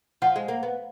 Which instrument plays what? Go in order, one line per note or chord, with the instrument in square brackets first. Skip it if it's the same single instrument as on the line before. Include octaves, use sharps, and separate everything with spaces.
[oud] F3 [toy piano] F#5
[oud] G#3
A#3
B3